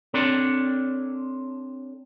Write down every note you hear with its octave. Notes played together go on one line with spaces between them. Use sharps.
C4 D4 A4 A#4 C#5 D5